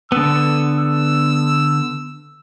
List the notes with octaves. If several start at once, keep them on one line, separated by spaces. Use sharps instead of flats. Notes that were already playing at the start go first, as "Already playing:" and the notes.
D3 B3 E6
E6